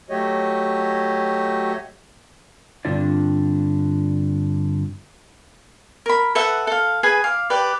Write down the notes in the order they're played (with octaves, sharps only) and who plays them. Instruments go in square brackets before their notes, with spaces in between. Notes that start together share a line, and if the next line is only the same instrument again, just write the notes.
[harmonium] F#3 A3 F#4 G4 C#5 D#5
[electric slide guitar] G2 D3 C4 D4 F4 D5
[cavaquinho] A#4 B5
A4 B4 E5 F#5
A4 F5
G#4 B4 G#5 B5
F5 D6
G4 B4 D5